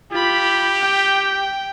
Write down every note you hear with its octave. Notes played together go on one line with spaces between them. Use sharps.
F4 G4 B5
G5